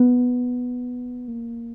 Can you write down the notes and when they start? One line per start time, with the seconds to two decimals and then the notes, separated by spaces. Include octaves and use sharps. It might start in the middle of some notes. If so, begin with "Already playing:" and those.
Already playing: B3
1.28 A#3